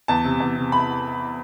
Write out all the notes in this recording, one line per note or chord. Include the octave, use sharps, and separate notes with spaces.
E2 A5
C3
E2
C3
B5